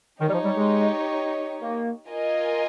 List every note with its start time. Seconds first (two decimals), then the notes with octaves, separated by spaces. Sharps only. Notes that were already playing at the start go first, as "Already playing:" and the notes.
0.20 D#3 D#4 G4 C#5
0.28 G3
0.33 F3
0.44 G3
0.56 G#3
1.62 A#3
2.08 F4 A#4 D#5 G#5